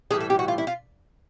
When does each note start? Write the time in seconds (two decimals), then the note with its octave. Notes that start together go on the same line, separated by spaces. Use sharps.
0.11 A2 E3 G3 G#4
0.21 A4
0.30 G4
0.39 F#4
0.48 F4
0.58 E4
0.67 F4